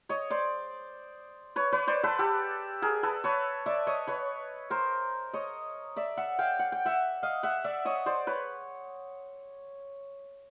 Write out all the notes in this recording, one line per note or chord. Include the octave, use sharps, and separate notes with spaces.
C#5 D#5
C5 D5
B4 C#5
B4 C#5
C5 D5
A4 B4
G4 A4
G#4 A#4
A4 B4
B4 C#5
D5 E5
C#5 D#5
B4 C#5
A#4 C5
C#5 D#5
D5 E5
E5 F#5
F5 G5
F#5
G5
E5 F#5
D#5 F5
E5 F#5
D5 E5
C#5 D#5
C5 D5
B4 C#5